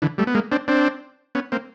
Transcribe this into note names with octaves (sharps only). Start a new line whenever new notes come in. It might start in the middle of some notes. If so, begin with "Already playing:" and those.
D3 E3
G3 A3
B3
G#3 A#3
C4 D4
C4 D4
B3 C#4
A#3 C4